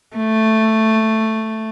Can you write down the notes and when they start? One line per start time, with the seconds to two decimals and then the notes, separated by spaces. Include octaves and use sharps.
0.17 A3